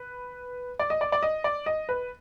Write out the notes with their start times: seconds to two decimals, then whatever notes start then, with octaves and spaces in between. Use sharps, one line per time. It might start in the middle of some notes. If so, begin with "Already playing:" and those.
Already playing: B4
0.79 D5
0.90 D#5
1.01 D5
1.12 D5
1.23 D#5
1.44 D5
1.66 D#5
1.89 B4